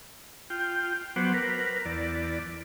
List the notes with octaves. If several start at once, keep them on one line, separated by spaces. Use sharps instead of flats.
F4 G5
F#3 B3 C5 F#5 D6
A#4 B4
E2 D5